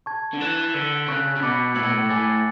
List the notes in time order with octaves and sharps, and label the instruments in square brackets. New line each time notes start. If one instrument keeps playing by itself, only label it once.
[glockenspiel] A5 C#6 G#6
[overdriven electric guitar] D3
[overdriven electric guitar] E3 [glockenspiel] F#6 A6 E7
[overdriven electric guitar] D3 [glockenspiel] E6 B6 F#7
[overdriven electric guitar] C#3 [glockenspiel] C#6 F#6 B6
[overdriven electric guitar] C#3
[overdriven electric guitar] B2 [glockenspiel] B5 D6 A6 C#7
[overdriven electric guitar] A2 [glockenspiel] E6 G#6 C#7 F#7
[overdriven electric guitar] B2
A2
[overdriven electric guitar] A2 [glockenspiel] G#5 D6 A6